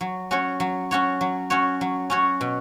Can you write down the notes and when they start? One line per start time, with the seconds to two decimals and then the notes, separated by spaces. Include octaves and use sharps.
0.01 F#3
0.31 C#4 F#4 C#5
0.60 F#3
0.91 C#4 F#4 C#5
1.21 F#3
1.50 C#4 F#4 C#5
1.81 F#3
2.10 C#4 F#4 C#5
2.41 B2